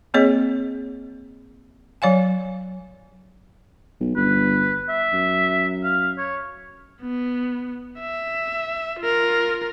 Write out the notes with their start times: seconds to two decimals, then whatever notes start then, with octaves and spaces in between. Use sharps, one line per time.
0.14 A#3 C4 G#4 C#5 D#5
2.02 F#3 C#5 F5 G#5
4.01 B1
4.16 G1 B4
4.89 E5
5.13 F#2
5.84 F5
6.18 C#5
7.02 B3
8.00 E5
9.00 F4 A#4